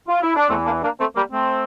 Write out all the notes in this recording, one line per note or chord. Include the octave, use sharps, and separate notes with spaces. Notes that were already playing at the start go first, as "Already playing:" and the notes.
F4
E4
D4
E2 E3 A3 C4
A#3 D4
A#3 D4
A3 C4
G3 A#3
A3 C4